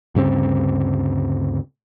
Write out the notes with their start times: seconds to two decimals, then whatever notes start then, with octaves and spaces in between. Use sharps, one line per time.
0.15 D2 G2 C#3 C4